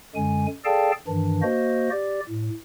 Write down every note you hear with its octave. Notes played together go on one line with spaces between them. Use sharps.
F#2 D3 G#3 G#5
G#4 A4 D5 F5 G5 A5
G2 D#3 E3 D4
A#3 F#4 C5 D#5
G4 D5
A2